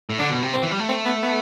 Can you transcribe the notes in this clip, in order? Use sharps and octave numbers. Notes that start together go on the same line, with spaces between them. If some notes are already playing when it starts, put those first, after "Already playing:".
A2
D3 D4
B2
C3
C4
E3
G3
A3
C4
B3
B3